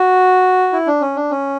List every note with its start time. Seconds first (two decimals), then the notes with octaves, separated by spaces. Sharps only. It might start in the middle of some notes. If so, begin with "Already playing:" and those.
Already playing: F#4
0.73 E4
0.87 D4
1.01 C#4
1.16 D4
1.31 C#4